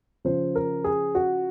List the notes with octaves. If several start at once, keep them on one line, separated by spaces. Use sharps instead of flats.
C#3 F3 C5
A#4
G#4
F#4